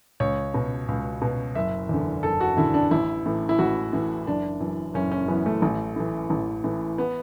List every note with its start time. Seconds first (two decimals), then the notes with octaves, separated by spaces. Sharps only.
0.20 C#2 C#5
0.54 B2
0.88 C#2
1.22 B2
1.55 F#1 E5
1.89 E2 D3
2.23 F#1 A4
2.41 F#4
2.57 E2 D3 E4
2.74 D4
2.91 A1 E4
3.26 A2 E3
3.49 E4
3.59 A1 F#4
3.93 A2 E3
4.27 F#1 D4
4.60 F#2 E3
4.94 F#1 C#4
5.11 C#4
5.28 F#2 E3 B3
5.46 A3
5.62 A1
5.96 A2 E3
6.30 A1
6.64 A2 E3
6.98 B3